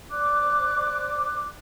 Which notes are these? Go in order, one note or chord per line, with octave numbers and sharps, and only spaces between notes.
C5 D5 D6 F#6